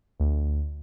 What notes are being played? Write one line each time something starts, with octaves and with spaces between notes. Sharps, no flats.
D2